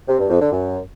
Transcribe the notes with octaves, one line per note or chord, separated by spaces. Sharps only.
C3
G2
F2
D3
F#2